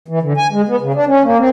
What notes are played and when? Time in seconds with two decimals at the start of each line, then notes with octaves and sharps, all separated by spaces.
0.08 E3
0.22 D3
0.37 G#5
0.52 G#3
0.68 B3
0.81 C#3
0.94 D4
1.07 C#4
1.24 A#3
1.39 C4